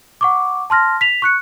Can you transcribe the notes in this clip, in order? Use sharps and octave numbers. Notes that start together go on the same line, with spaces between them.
F#5 C#6 D6
A5 C6 F6 A#6
B6 F7
C#6 F#6 C#7